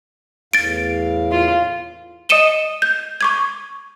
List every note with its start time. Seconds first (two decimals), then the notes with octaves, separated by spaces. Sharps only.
0.53 E2 A2 F5 A6 D7
1.31 F4
2.29 D#5 D#6 C#7 D#7 E7 G7
2.82 G6
3.21 C#6 D6 G#6